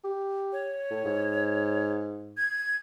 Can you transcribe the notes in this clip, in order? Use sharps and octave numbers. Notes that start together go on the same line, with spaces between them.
G4
C#5
A2
G#2
G#6